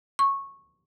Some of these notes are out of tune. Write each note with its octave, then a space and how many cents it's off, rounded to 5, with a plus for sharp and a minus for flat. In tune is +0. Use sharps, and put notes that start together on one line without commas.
C#6 -15